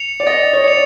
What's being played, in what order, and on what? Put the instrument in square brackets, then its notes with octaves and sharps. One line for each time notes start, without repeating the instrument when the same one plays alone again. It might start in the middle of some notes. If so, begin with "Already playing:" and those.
Already playing: [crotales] C#7 F7
[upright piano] D5
[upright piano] D#5 [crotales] A6
[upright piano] C#5
[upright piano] D5 [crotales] C#7 F7